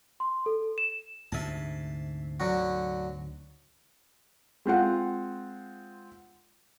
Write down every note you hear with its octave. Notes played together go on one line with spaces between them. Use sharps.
C6
A4
E7
D2 G#2 C3 E5 A5
D3 F#3 F#4
G#3 C4 F4 F#5